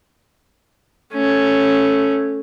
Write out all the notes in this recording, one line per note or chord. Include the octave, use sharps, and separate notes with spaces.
A3 C#4